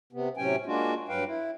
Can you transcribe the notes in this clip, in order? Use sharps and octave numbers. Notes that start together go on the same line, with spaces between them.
C3 B3
A2 C3 F#3 C#4 G5 G#5
G#3 A#3 D4 F4 F#4
G2 F#3 B4 F5 G5
E4